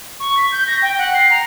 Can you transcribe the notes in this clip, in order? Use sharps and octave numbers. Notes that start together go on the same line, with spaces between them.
C#6
B6
G6
A#6
G5
F#5
C7
A#5